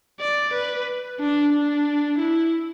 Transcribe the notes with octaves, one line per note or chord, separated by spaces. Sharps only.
D5
B4
D4
D4
E4